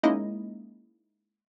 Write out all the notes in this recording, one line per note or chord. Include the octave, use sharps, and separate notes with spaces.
G#3 A#3 C#4 D#4 E4 D#5